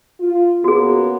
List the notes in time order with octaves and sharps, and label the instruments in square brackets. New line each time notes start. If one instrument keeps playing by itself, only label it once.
[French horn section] F4
[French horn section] C#3 A#3 B3 [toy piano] F#4 G#4